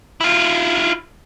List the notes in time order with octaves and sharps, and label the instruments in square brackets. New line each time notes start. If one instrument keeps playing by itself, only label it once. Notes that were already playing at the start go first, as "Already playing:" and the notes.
[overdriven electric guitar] E4 F4